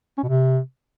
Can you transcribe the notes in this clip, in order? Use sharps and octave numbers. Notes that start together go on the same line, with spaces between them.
C#4
B2
C3